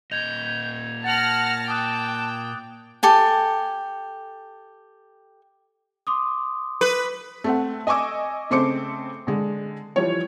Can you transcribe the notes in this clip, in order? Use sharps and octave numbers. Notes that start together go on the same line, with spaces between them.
A#2 D#5 G6 G#6 F7
F#5 A5 F6 A6 A#6
G5 A5 D6 D#6 F#6
G4 A4 G#5
C6 D6 D#6
B4
A3 C4 F#5
D#5 G#5 C#6 D6 E6
C#3 A3 C4 C5 D6 C#7
D3 G#3
E3 F3 G3 C#5